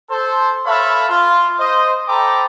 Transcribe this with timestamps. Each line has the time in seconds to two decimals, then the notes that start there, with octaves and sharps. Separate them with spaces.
0.10 A4 C5
0.66 A4 B4 C#5 E5 F5 B5
1.09 F4
1.59 C5 D#5
2.08 A4 C5 G5 A#5 B5 D6